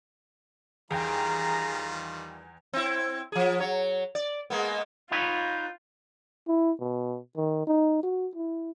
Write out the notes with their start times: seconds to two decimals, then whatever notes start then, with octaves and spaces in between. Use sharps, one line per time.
0.91 E2 D#3 G3 F4 G#4 G5 A#5 G6
2.73 C4 E4
3.32 F3 G#4
3.60 F#3 C#5
4.15 D5
4.50 G#3 A#3 B3
5.11 D#4 F4 B4 C#5
6.48 E4
6.80 B2
7.37 D#3
7.67 D#4
8.03 F#4
8.35 E4